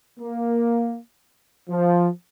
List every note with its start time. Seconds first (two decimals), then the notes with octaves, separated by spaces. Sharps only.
0.20 A#3
1.69 F3